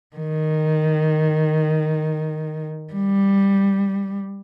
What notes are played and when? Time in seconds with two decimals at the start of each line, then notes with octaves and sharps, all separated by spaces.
0.16 D#3
2.93 G3